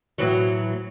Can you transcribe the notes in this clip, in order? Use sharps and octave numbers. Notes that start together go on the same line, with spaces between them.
A2 E3 F#3